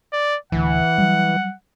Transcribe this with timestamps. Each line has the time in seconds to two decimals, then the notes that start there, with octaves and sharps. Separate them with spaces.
0.13 D5
0.52 D1 D2 E3 F#5
0.98 F#3 G3